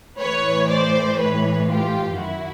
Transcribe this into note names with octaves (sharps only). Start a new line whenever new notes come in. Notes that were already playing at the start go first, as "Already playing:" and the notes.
A2 E3 B4 C#5
C5 D5
B4 C#5
F4 G4
F#2 D#3 F#3 E4 F#4